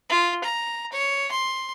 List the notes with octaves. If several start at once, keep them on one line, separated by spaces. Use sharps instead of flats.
F4
A#5
C#5
C6